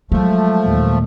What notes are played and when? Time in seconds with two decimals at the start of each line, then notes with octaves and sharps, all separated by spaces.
0.12 F3 F#3 G#3 A3
0.63 D#2 A#2